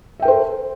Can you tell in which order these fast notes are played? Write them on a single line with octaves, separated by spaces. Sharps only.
E5 G5 A#4 C5 A4